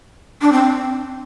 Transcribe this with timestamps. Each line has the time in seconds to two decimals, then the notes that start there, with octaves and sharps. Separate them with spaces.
0.41 D4
0.52 C4